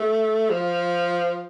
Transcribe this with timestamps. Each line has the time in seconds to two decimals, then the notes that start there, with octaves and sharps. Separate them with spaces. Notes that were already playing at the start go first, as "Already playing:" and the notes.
Already playing: A3
0.50 F3